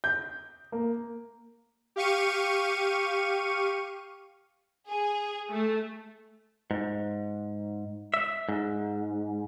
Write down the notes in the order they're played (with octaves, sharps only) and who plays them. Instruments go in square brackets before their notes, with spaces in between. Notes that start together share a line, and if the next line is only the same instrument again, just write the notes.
[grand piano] G6
A#3
[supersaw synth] G4 F5 C#6 D#7
[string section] G#4
A3
[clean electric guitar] G#2
E5
G#2